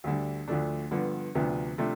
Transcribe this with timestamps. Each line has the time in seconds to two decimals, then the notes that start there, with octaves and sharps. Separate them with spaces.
0.04 D2 D3 G3
0.48 D2 D3 F3 A3 D4
0.91 G2 D3 F3 B3
1.35 D2 C3 F3 B3 D4
1.78 C3 F3 A3 D4